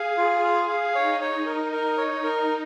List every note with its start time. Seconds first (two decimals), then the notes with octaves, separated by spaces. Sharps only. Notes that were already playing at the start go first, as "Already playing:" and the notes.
Already playing: G#4 F5
0.17 F4
0.44 F5
0.68 F5
0.94 D#4 C#5
1.21 C#5
1.46 A#4
1.72 A#4
1.98 C#5
2.24 A#4